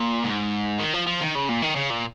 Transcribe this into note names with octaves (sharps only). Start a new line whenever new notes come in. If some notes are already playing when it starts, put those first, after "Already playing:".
Already playing: A#2
G#2
D#3
F3
F3
D#3
C#3
A#2
D#3
C#3
A#2